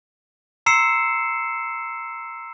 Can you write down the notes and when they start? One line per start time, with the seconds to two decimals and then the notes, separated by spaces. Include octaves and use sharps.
0.66 A#5 C6 E6 C7 C#7 E7